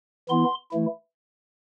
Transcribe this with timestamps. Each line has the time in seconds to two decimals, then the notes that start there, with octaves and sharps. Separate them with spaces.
0.29 E3 B3 E4 C6
0.71 E3 A3 E4